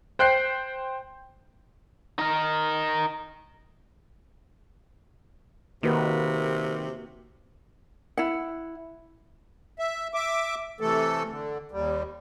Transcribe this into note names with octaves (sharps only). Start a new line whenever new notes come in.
C5 G5 F#6 G6 C7
D#4 A#4
C3 D#3 A#3 F#4 B4
E4 F#5
E5
E5 D6
C3 E3 A3 A4
D3
D#2 G3